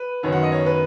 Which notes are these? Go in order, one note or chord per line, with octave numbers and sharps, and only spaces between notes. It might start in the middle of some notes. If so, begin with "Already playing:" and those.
Already playing: B4
F#2 D#3 B3 C#5
F#5
D#5
C#5
B4